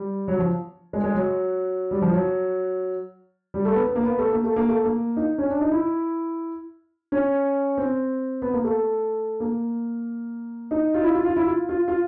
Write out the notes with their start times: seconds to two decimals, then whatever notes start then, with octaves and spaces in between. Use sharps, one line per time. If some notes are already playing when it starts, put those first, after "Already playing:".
Already playing: G3
0.28 F#3
0.39 F3
0.93 G#3
1.04 G#3
1.14 F#3
1.91 G3
2.02 F3
2.13 F#3
3.54 G3
3.65 A3
3.75 B3
3.86 B3
3.96 A#3
4.03 B3
4.19 A3
4.31 A#3
4.44 A3
4.56 A#3
4.69 A3
4.84 A#3
5.17 D#4
5.38 C#4
5.49 D4
5.61 D#4
5.71 E4
7.12 C#4
7.77 C4
8.42 B3
8.54 A#3
8.64 A3
9.40 A#3
10.71 D#4
10.94 F4
11.03 E4
11.14 F4
11.25 F4
11.36 E4
11.46 F4
11.69 F4
11.88 F4